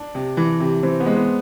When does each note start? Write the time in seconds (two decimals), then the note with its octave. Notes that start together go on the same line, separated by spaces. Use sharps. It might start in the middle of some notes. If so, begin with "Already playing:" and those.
Already playing: D4
0.15 C3
0.37 E3
0.60 C3
0.83 E3 C4
1.00 B3
1.06 G#3
1.17 B3